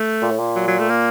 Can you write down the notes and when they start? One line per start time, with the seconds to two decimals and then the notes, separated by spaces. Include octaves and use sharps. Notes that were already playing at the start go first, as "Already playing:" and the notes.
Already playing: A3
0.22 A#2
0.31 A2
0.39 A#2
0.56 F#3
0.68 F#3
0.79 A3
0.90 A#3